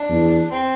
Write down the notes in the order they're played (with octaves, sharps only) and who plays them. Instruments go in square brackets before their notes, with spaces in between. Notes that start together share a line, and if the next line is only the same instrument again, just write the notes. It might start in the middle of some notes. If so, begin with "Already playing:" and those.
Already playing: [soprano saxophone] D4
[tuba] E2
[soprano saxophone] C4